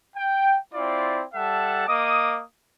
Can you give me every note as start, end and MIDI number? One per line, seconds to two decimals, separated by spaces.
0.16 0.56 79
0.74 1.24 60
0.74 1.24 64
0.74 1.24 65
0.74 1.24 74
1.34 1.85 55
1.34 1.85 69
1.34 1.85 76
1.34 1.85 78
1.34 1.85 81
1.87 2.40 58
1.87 2.40 75
1.87 2.40 86
1.87 2.40 87